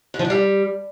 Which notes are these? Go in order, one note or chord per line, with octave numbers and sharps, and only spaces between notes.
G2
F3
D3
G3